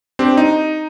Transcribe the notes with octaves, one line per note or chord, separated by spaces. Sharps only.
C4 D4 G4
D#4